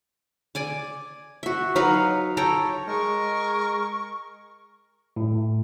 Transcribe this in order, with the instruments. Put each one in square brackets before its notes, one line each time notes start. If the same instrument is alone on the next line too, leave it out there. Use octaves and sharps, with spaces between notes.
[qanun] D5 G#5 D6
F#4 E5
F#3 D#4 B4 F5
A4 C#5 G5 A#5
[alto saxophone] G#3 [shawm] A#4 [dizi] C#6
[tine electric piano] A2